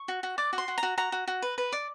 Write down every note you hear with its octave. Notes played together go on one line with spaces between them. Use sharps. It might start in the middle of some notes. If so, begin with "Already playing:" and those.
Already playing: C#6
F#4
F#4
D5 D6
F#4
C6
F#4
A#5
F#4
F#4 A#5
F#4
F#4
B4
B4
D5